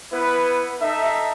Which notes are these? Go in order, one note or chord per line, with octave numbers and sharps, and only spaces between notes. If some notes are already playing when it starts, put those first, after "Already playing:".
B3 E4 B4
D#4 A4 E5